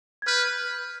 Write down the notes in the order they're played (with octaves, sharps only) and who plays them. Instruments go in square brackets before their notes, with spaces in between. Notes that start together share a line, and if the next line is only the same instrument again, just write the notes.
[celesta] G#6
[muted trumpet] B4 [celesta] F6 G6